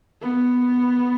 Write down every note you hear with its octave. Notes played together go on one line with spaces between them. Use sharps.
B3